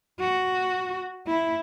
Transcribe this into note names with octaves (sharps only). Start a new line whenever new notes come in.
F#4
E4